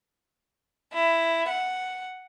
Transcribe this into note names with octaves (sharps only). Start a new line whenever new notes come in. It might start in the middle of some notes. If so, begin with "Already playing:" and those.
E4
F#5